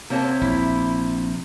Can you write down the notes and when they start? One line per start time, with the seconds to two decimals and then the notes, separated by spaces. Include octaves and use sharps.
0.10 C3 A#3 C#5 A5
0.41 A#1 E4